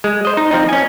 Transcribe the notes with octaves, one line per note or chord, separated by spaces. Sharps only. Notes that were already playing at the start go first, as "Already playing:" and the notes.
G#3
C5 D#5
D#4
F3 C4 D#4
C#4 G#5